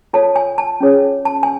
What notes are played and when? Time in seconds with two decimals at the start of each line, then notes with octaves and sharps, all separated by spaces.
0.13 F4 A4 C#5 A5
0.36 G#5
0.58 A5
0.80 C#4 F4 G#4 C#5
1.25 A5
1.43 G#5